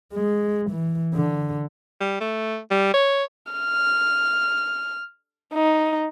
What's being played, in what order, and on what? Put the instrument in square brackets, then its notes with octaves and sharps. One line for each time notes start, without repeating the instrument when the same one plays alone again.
[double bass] G#3
E3
D3
[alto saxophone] G3
A3
G3
C#5
[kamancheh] F6
D#4